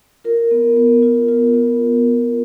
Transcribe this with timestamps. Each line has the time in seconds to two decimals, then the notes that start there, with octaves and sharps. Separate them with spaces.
0.24 F4 A#4
0.51 B3
0.77 B3
1.03 F4
1.28 F4
1.54 B3